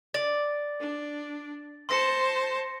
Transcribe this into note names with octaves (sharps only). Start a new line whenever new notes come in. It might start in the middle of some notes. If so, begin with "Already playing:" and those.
D5 A6
D4
C5 A5 C6 A#6 C#7